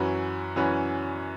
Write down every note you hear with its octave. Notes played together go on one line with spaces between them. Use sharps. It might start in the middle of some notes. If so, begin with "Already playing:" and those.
Already playing: F#2 E3 C#4 F#4 B4
F#2 E3 C#4 F#4 B4